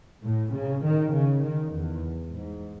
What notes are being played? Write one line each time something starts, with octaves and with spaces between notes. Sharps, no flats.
A2
C#3
D#3
C#3
D#3
E2
G#2